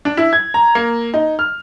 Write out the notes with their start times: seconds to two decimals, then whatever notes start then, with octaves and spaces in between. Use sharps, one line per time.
0.05 D4
0.17 E4
0.33 G#6
0.54 A#5
0.75 A#3
1.14 D#4
1.39 F6